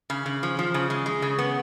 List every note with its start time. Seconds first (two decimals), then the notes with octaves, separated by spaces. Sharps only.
0.10 C#3
0.26 C#3
0.43 F3
0.59 F3
0.74 C#3
0.90 G#3
1.06 G#3
1.22 C#3
1.39 B3